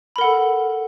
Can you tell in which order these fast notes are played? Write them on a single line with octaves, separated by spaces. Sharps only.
B5 A#4 F#5 A4